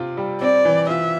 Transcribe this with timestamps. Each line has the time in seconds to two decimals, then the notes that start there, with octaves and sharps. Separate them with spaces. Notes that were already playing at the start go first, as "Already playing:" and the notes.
Already playing: C3 F4
0.17 G3
0.41 C4 D5
0.65 E3
0.89 F4 E5